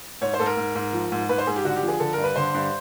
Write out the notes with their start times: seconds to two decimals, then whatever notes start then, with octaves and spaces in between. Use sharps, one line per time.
0.21 G#2 C#5
0.34 C5
0.40 G#2 A4
0.46 A#4
0.57 G#2
0.75 G#2
0.93 F3
1.12 G#2
1.29 G#2 B4
1.38 C5
1.47 G#2 G#4
1.56 G4
1.65 D3 F#4
1.76 G4
1.83 F3
1.88 G#4
2.00 D3 A4
2.13 G2 A#4
2.24 B4
2.36 D3 C5
2.54 G2